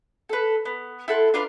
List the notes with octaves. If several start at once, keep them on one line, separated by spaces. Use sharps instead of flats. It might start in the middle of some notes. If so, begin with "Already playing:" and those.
A4 B4
B3
E4 A4 F#5 C6
D4 F4 A#4 B4